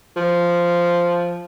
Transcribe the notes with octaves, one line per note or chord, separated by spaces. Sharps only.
F3